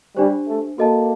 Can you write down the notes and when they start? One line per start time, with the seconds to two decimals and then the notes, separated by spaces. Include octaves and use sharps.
0.16 G3 D4 G4 C5
0.47 A3
0.78 A#3 F#4 A4 D#5 A5